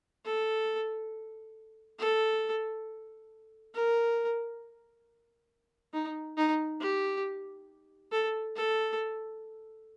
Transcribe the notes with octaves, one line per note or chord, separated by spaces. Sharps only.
A4
A4
A#4
D#4
D#4
G4
A4
A4